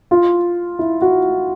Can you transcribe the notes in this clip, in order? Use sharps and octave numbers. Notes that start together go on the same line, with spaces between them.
F4
E4
F#4